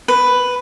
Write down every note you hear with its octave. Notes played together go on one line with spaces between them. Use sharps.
B4